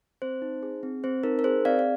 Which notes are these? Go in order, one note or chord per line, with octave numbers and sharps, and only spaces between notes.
C4 C5
D#4
G#4
C4
C4 C5
D#4 A#4
A#4
G#4 C5
C4 D5 F5
F5